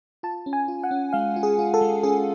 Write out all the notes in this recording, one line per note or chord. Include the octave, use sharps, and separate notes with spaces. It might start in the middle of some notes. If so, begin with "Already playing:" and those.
F4 A5
C#4
G#5
F4
F#5
C#4
G#3 F5
F4
G#4
F4
A4
G#3
C#4 G#4